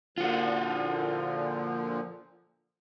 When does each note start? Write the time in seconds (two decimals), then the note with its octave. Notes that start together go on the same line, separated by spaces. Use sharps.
0.18 A#2 D3 F3 F4 F#4